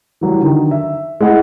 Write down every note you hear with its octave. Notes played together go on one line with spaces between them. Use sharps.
E3 F#3 G3
D3 D#3
E5
G#3 E4 F#5